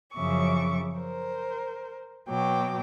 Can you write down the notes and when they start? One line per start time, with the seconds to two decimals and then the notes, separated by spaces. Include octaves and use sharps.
0.14 F#2 C#3 F3 E5 C#6 D6
0.99 A#4 C5
2.28 B2 F#3 G5 D6